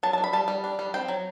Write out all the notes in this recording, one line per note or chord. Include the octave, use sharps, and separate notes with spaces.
F#3 A5
A5
D4
B5
G3 A5
G3
D4
G3
C4 G5
F#3